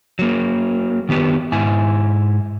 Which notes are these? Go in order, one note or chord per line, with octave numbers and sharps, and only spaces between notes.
F#3 A#3
D#3 B3 G4 B4
G#2 E4 G#5